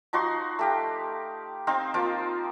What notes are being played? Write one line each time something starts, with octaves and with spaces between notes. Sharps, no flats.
F3 D#4 F#4 C6
A3 G4 F5
C4 D#4 C5 F5
F3 A#3 F4